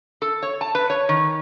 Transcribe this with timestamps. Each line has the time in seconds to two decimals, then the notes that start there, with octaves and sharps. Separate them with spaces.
0.22 A4
0.43 C#5
0.61 A5
0.75 B4
0.90 C#5
1.09 D#3